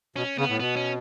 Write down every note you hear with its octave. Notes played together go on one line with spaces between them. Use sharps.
B2 C#4
C#3 B3
A2
B2 B3
C#4